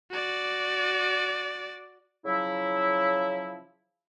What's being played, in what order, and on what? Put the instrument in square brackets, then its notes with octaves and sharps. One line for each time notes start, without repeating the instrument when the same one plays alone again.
[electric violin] F#4 D5
[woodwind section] C#3 F3 F#3 E4